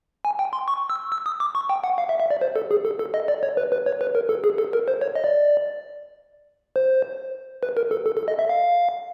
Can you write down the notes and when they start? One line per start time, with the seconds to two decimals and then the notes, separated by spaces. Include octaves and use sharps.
0.25 G#5
0.39 G5
0.53 C6
0.68 C#6
0.90 E6
1.12 E6
1.26 D#6
1.40 D6
1.55 C#6
1.70 G5
1.84 F#5
1.98 F5
2.09 E5
2.20 E5
2.31 D5
2.41 C5
2.56 A4
2.71 G#4
2.85 A4
2.99 A4
3.14 D#5
3.28 D5
3.43 C#5
3.57 B4
3.72 B4
3.86 C#5
4.01 B4
4.15 A#4
4.29 A4
4.44 G#4
4.58 A4
4.73 A#4
4.88 C5
5.01 C#5
5.16 D#5
5.24 D5
6.76 C5
7.63 B4
7.77 A#4
7.91 A4
8.06 A4
8.17 A4
8.28 D#5
8.39 E5
8.49 F5